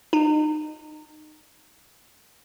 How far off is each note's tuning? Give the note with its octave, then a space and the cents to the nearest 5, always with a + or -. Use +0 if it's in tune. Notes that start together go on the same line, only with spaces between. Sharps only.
D#4 -30